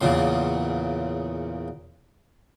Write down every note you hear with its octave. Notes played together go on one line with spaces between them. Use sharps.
E2 A#2 C#3 C6